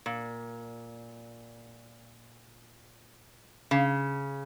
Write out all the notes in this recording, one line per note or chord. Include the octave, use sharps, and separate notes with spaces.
A#2
C#3